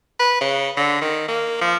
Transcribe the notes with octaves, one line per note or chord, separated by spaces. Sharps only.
B4
C#3
D3
D#3
A#3
F3